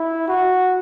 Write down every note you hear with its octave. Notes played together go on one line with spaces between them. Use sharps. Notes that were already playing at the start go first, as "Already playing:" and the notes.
Already playing: E4
F#4